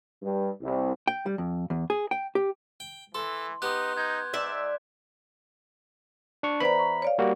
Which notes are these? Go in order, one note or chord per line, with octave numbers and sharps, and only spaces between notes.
G2
C2
G5
G3
F2
E2
G#4
G5
G4
G5
E3 A4 C6
B3 D#4 G4 C6 F#6
D#4 G6 G#6
G#2 D5 E5
D4 C#6
E2 B4 C5 D5 A#5 B5
C#6
C#5 D5 F5
G3 A#3 F#4